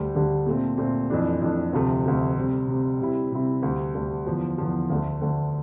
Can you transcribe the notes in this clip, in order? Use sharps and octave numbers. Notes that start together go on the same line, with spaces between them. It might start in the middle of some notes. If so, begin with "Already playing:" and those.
Already playing: D2 D3 G3
D2 D3 G3
A#2 A3 C4
A#2 A3 C4
F2 E3 A3 D4
F2 E3 A3 D4
D2 C3 F3 A3
D2 C3 F3 A3
C3 G3 C4
C3 G3 C4
C3 G3 C4 E4
C3 G3 C4 E4
D2 D3 G3
D2 D3 G3
E2 D3 F3
E2 D3 F3
D2 D3 A3
D2 D3 A3